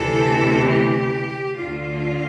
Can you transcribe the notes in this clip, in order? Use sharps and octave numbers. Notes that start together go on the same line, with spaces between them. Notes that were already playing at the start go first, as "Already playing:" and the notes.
Already playing: D2 C3 E3 A4
G4
D2 D3 F4